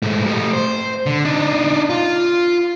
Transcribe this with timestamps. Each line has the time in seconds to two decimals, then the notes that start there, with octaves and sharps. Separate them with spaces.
0.03 G#2 A3
0.26 A3 G4
0.53 C5
1.06 D3
1.25 D4 D#4
1.90 F4